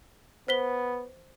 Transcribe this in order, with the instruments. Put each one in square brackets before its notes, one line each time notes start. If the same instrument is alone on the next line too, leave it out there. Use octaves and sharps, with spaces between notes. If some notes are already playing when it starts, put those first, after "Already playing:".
[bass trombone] B3 [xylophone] C5 B6 G7